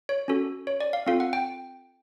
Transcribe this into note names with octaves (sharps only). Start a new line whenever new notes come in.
C#5
C#4 F#4 A4
C#5
D5
F5
C4 F4 A4 F5
F#5
G5